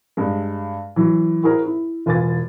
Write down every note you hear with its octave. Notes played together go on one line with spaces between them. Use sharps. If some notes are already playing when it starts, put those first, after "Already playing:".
G2 G#3
E3 F#3
E4 F#4 G#4 A#4 C5
E4
E1 F4 B4 G#5 D6 A6